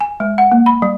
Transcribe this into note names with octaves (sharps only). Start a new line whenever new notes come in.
G#5
G#3
F#5
A#3
B5
G3